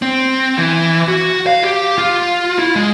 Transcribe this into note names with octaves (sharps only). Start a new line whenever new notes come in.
C4
E3
F#4
F5
G4
F4
E4
G#3